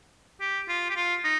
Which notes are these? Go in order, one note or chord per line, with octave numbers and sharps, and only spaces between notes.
G4
F4
G4
F4
D#4